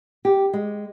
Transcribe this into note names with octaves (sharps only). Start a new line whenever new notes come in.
G4
G#3